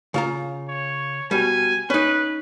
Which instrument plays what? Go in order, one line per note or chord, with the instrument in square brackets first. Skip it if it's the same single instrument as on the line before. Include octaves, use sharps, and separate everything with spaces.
[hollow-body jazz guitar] C#3 F4 A#5
[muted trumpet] C#5
[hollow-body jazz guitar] B2 G3 [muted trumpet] G#5
[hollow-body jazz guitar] C#4 D#4 [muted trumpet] B4